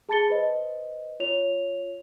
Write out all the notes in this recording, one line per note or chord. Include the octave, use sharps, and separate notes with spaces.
G#4 A5 B5 A6 C#7 G7
B4 C5 D#5
F4 C#5 F7